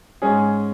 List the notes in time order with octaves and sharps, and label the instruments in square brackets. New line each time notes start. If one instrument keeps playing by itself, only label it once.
[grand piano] G#2 G#3 C#4 G#4